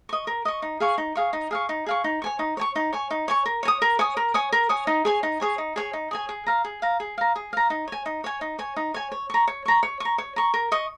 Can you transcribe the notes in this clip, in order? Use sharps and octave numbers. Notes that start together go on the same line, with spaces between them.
D#5 C#6
A#4
D#5 C#6
D#4
G#4 F5 C#6
D#4
G#4 F5 C#6
D#4
G#4 F5 C#6
D#4
G#4 F5 C#6
D#4
C#5 G#5 C#6
D#4
C#5 G#5 C#6
D#4
C#5 G#5 C#6
D#4
C#5 G#5 C#6
A#4
C#5 G#5
D#6
A#4
C#5 G#5 D#6
A#4
C#5 G#5 D#6
A#4
C#5 G#5 D#6
D#4
G#4 C#5 G#5
D#4
G#4 C#5 G#5
D#4
G#4 C#5 G#5
D#4
G#4 C#5 G#5
G#4
F5 A#5
G#4
F5 A#5
G#4
F5 A#5
G#4
F5 A#5
D#4
C#5 G#5
D#4
C#5 G#5
D#4
C#5 G#5
D#4
C#5 G#5
C#5
A#5 C#6
C#5
A#5 C#6
C#5
A#5 C#6
C#5
A#5 C#6
A#4
D#5 C#6